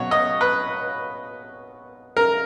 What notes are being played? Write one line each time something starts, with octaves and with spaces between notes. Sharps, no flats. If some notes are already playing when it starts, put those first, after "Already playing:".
Already playing: B2 F#3 C#5
D#5
B4
A#4